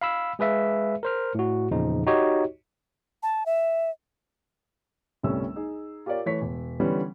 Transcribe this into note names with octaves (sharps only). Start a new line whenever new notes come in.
F5 B5 E6
G#3 G#4 B4 E5 F5
A#4 C5 F6
A2 F#4
E2 A#2 C#3 F3 D#4
D#4 F#4 G4 C#5 D#5
A5
E5
G1 C2 G3 A3 C#4 E6
D#4 G#4
F4 G4 A#4 C#5 D5
E3 A3 C#5 B6
E1
D3 E3 G3 B3 C#4